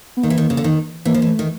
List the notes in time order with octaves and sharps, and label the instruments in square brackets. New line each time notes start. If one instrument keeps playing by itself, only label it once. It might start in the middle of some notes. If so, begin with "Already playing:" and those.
[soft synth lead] B3
[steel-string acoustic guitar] D#3 [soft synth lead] A#3
[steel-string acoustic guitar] E3
D#3
C#3
D3
D#3
[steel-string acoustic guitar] E3 [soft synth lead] A#3
[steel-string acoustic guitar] F3
E3
[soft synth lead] A3
[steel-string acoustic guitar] D#3